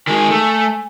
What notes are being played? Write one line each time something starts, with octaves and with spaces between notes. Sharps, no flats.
D#3 G#3 G#5
A3